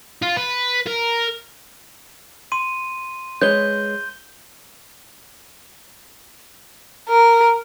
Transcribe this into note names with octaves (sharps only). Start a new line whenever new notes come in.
F4
B4
A#4
C6 D#7
G#3 B4 C#5 G6 G7
A#4